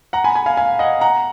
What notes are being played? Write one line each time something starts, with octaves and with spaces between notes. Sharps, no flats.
F#5 A#5
G#5 B5
G#5 B5
F5 G#5
F5 G#5
D#5 F#5
F#5 A#5